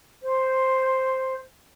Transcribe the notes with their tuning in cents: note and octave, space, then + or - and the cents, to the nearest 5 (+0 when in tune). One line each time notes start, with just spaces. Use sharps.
C5 +0